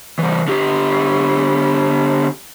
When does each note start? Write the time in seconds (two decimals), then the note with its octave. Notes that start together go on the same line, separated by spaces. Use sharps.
0.19 E3 G3
0.48 D3 G4